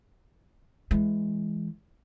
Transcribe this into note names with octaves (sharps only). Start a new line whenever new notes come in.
E3 G#3